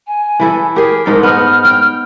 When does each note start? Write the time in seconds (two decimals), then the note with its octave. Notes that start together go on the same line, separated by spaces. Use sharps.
0.07 G#5
0.40 E3 E4 A4
0.76 G4 G#4 A#4
1.06 G#2 D#4 A4
1.23 B3 D#4 F6
1.65 G5